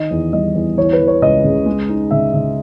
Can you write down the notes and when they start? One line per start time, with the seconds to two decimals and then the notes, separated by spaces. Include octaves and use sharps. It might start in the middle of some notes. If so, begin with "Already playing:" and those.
Already playing: D#3 D#5
0.11 E2
0.33 G3 D#5
0.55 E2
0.77 E3 C#5
0.93 B4
1.00 E3
1.07 C#5
1.22 C#2 D#5
1.44 C#3
1.66 G#3
1.89 D#4
2.11 C#3 E5
2.33 C#3 E5